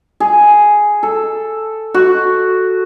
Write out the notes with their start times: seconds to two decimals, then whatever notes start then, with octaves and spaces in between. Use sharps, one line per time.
0.20 G#4
1.03 A4
1.94 F#4